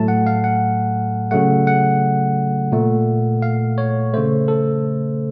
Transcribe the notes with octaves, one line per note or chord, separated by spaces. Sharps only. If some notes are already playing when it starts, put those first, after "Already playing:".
Already playing: A2 F#3 A3 A5
F#5
F5
F#5
C#3 F#3 A3 F#5
F#5
A#2 A3
F5
C#5
C#3 A3 C5
A4